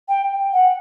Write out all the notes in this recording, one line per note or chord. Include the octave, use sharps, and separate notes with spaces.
G5
F#5